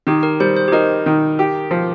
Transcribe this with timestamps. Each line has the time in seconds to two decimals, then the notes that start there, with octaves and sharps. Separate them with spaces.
0.07 D#3 G4
0.23 A#4
0.40 G3 C5
0.57 C5
0.68 G4
0.72 D#4 A#4
1.06 D#3
1.39 G4
1.71 F3